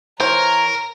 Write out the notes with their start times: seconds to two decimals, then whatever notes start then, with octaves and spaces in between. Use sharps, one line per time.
0.20 E3 A#4 C5 C#5 A#5